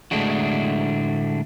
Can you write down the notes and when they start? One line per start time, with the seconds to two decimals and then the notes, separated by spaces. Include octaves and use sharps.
0.11 A2 D3 G#3 A3 D4 F#4